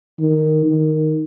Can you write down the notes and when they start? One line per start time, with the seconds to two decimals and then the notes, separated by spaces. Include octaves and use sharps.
0.19 D#3
0.66 D#3